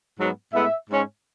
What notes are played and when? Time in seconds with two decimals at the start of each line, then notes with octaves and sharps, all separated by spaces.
0.18 G#2 F#3 B3
0.53 A2 G#3 B3 E5
0.89 G#2 G#3 C#4